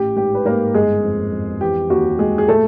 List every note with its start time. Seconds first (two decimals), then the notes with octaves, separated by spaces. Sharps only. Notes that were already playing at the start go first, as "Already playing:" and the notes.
Already playing: A1 G4
0.16 G#2 G4
0.35 B4
0.45 G#2 A#3 A#4
0.74 G1 G#3 G#4
1.03 F2
1.32 F2
1.61 E3 G4
1.90 D#2 F#4
2.19 D#2 G#3 G#4
2.38 G#4
2.48 A#2 A3 A4